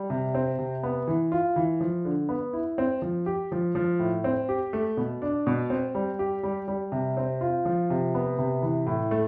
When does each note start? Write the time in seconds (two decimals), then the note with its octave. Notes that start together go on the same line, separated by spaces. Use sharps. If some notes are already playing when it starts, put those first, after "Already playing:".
Already playing: G3
0.10 C3
0.34 C4
0.59 C3
0.83 B3
1.07 E3
1.32 F4
1.56 E3
1.80 F3
2.05 D3
2.29 B3
2.53 E4
2.78 C4
3.02 F3
3.26 G4
3.52 F3
3.75 F3
3.99 A2
4.24 C4
4.49 G4
4.73 A3
4.97 B2
5.22 D4
5.47 B2
5.70 C4
5.95 G3
6.19 G4
6.43 G3
6.68 G3
6.92 C3
7.17 C4
7.41 F4
7.65 F3
7.90 C3
8.15 B3
8.38 C3
8.62 E3
8.87 A2
9.11 A3